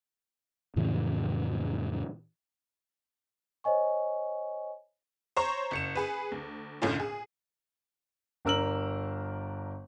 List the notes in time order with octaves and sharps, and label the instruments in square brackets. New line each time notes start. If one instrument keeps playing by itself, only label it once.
[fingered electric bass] F2 A2 C#3 E3
[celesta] C5 C#5 D#5 G#5 C#6
[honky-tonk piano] C5 C#5 A#5 C#6
F#1 C#7 E7
G#4 B4
D2
F#1 B1 A2 D3 C#4 F4
G#4
[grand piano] G1 D4 A#4 E6 F6 F#7